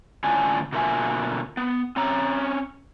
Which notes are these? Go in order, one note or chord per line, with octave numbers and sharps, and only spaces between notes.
A2 D3 C#4 D4 F4 G#5
B2 D3 A#3 F4 E5 G#5
B3
C4 C#4 A#5